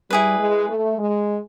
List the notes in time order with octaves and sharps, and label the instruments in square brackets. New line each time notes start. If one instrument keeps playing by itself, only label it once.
[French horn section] G3 [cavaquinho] E4 G#4 B4
[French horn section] G#3
A3
G#3